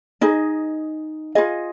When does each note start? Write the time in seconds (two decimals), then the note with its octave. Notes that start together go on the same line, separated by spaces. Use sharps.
0.21 D#4 G#4 D#5
1.35 F4 G#4 D#5